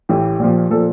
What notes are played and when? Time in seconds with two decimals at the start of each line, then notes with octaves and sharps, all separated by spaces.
0.09 A1 A2 E3 G4
0.39 A#1 A#2 F3
0.70 A#2 F3 A4